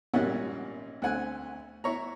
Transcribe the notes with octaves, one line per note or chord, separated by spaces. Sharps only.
G#1 A#2 G3 C#4 E4 F#5
D2 C4 F#5 G#5
E4 C#5 A#5